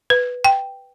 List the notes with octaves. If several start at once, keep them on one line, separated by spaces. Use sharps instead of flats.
B4
G5